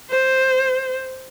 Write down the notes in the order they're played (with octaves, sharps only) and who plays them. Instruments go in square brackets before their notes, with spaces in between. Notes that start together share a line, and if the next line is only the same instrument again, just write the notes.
[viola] C5